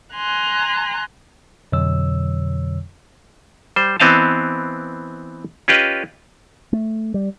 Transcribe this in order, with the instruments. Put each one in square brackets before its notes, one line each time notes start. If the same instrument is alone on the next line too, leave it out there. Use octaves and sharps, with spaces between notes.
[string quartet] G#5 A#5 C6 F#6
[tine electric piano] F2 B2 D3 F#3 C#5 E6
[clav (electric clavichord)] G3 C5
E3 B3 C4 D#5 F5 A5
C#4 F4 G4 B4 D#5
[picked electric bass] A3
G3